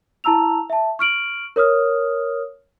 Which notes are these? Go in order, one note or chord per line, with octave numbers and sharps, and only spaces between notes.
E4 A5 A#5 E6 F7
E5 A5
C#6 F6 D7 F#7
A#4 C#5 D#6 F6